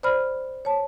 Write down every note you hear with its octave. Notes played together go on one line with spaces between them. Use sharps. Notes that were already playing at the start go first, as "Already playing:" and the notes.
C5 D5 B5 F6
C#5 A5